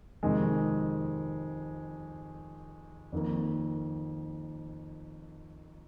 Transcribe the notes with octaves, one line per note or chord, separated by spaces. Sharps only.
F2 C3 D#3 G#3
F2 D#3 A#3